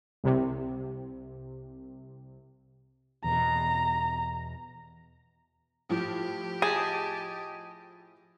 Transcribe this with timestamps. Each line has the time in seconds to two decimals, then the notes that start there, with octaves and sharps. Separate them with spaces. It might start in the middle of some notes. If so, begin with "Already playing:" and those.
0.24 C2 C3
3.24 E2 B2 A#5
5.89 A2 F3 G4
6.62 G#4 D#5 G#5 A5